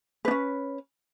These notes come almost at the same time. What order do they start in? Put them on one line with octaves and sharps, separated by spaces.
B4 D4 C#4